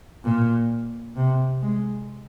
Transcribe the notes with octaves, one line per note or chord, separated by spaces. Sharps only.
A#2
C3
G#3